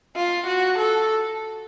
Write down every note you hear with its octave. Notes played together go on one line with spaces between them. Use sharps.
F4
F#4
A4